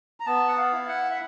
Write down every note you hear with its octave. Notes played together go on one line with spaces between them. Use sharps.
A#5
B3 A5
F#5
F5
E4
F#5
E5